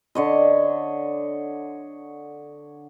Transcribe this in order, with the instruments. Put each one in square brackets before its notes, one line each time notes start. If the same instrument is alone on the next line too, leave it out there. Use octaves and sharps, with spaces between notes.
[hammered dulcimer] D3 C#5 D#5